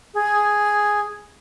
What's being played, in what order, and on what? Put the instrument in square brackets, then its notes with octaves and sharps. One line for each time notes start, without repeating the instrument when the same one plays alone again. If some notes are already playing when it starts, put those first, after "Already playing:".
[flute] G#4